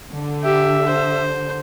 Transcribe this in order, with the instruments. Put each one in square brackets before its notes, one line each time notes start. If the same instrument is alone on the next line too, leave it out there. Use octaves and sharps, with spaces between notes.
[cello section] D3
[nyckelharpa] G4 [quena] E5
[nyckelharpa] C5